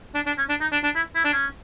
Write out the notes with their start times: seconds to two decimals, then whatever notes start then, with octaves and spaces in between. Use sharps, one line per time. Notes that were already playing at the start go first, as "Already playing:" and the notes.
0.15 D4
0.26 D4
0.38 C#4
0.49 D4
0.61 D#4
0.72 D4
0.84 D4
0.95 E4
1.15 E4
1.24 D4
1.33 C#4